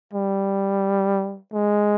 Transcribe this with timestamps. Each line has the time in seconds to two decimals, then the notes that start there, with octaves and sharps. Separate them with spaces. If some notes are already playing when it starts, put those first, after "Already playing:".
0.14 G3
1.53 G#3